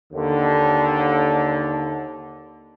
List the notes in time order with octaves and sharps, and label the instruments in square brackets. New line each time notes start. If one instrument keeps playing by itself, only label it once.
[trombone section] D#2 D3